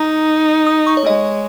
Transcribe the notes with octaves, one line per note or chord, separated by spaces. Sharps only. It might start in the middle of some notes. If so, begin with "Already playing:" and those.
Already playing: D#4 A#5
D#6
C#6
C#5
G#3 D#5